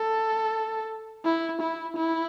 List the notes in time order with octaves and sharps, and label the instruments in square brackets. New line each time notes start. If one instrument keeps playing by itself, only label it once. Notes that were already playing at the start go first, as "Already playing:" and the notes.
Already playing: [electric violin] A4
E4
E4
E4